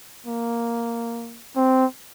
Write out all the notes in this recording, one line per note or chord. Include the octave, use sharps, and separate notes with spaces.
A#3
C4